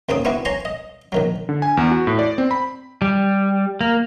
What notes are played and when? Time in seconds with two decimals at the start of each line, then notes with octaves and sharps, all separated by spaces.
0.09 D#2 C#3 C4 D#6
0.25 B3 C4 D4 E4 F#4
0.45 C#5 G#5 A#5 C6
0.65 D#5
1.12 A#1 D#3 F#3
1.49 D3
1.62 G#5
1.77 E2
1.91 F#4
2.07 A2
2.19 D5
2.38 C4
2.51 B5
3.02 G3
3.81 A#3